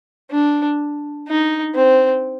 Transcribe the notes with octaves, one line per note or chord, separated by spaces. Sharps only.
D4
D#4
C4